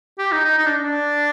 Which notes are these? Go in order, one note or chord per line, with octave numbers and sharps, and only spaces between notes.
G4
D#4
D#4
D#4
D4
D4